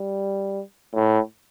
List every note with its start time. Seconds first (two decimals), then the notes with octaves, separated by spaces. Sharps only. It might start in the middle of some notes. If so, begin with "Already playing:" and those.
Already playing: G3
0.94 A2